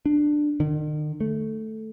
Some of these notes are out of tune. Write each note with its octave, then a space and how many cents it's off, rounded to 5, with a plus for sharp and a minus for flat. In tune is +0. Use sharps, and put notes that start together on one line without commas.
D4 +15
D#3 -45
A3 -5